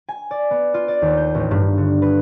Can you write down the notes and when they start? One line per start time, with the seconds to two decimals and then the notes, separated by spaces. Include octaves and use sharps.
0.09 G#5
0.31 D5
0.51 B3
0.74 F4
0.88 D5
1.02 D#2
1.17 G6
1.34 A1
1.51 G2
1.78 D3
2.02 B4